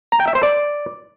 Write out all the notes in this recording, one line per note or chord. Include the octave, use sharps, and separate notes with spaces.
A#5
G5
E5
C5
D5